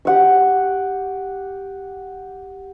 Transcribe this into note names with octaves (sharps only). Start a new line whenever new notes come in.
G4 F#5 C#6